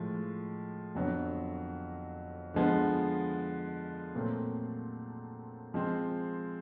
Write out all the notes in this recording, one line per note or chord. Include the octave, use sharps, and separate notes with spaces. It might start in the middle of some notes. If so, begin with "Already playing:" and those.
Already playing: A2 F3 G#3
F2 D3 F#3 B3
D3 F3 G#3 B3
A#2 F#3 A3 C4
F3 G#3 C4